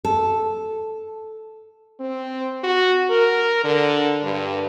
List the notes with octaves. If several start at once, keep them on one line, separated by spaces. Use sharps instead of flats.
A4
C4
F#4
A#4
D3
G2